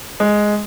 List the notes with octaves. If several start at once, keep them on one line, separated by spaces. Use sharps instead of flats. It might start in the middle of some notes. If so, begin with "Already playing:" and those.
G#3